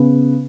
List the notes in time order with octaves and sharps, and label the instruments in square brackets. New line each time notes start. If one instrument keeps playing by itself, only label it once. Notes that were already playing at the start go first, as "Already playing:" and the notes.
Already playing: [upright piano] C#3 B3